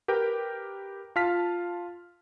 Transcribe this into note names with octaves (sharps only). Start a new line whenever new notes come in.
G4 A#4 B4 G5
F4 F5 A5 F6 B6